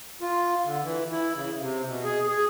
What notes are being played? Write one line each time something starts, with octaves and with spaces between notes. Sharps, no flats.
F4
D3
E3
E4
C#3
C3
B2
G#4
G#4